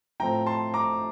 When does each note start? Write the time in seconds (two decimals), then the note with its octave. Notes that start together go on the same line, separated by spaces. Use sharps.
0.20 A2 F3 C4 G5 A#5
0.46 A5 C6
0.74 A#5 D6